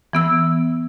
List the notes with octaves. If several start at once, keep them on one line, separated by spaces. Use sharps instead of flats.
E3 B3 E6